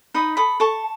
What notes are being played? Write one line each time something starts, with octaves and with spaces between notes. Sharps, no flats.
D#4 B5 D#6
A4 B5 D#6
A4 A5 C#6